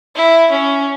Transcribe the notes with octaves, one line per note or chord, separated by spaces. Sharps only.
E4
C#4